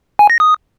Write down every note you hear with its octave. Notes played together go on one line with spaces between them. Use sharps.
G#5
A#6
D#6